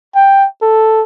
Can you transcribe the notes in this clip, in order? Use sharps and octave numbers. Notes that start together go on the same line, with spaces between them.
G5
A4